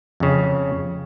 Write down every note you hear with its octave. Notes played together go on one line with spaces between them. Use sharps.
F2 C#3